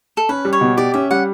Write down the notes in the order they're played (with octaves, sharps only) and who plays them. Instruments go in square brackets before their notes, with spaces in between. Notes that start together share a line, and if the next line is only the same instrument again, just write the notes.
[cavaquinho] A4
[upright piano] C#4 [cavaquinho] B4
[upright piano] G3
[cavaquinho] C#5
[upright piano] B2
[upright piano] G4 [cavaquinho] D5
[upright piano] C#4 [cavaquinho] E5
[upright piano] G3 [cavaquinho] F#5